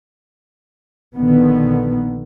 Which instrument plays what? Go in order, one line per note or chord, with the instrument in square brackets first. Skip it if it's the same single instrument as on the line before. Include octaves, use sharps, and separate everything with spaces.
[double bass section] A#1 D3 D#3 B3